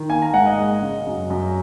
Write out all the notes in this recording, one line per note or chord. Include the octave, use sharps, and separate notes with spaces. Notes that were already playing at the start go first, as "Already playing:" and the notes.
Already playing: D#3
A#3 G#5
A#5
G#2 F#5
D#5
G#3
C#3
F#2
F#2